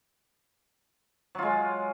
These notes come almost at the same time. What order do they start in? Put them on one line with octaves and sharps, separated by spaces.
F#3 F4 G#3